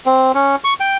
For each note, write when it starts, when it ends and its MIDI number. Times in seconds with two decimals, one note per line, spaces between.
0.06 0.32 60
0.35 0.56 61
0.64 0.74 85
0.80 0.97 79